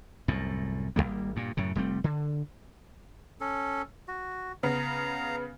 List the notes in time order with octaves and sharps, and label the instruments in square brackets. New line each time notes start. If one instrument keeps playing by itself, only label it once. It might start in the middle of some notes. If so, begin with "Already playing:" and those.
[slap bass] C2 F#2 A2
G#1 G#2 G3 A#3
G2 A#2
F#2 A2 C#3
F1 G3 A3 C4
D3
[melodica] C#4 A4
F#4
[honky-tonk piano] C#3 B3 [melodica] F5 A#5